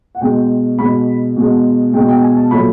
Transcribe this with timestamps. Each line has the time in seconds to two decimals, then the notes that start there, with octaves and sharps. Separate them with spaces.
0.15 F#5
0.21 B2 G#3 G5
0.79 B2 G#3 B5
1.36 B2 G#3
1.93 G#3 G5
1.98 B2
2.09 G5
2.23 G#5
2.37 A5
2.51 A#2 F#3 A3 B5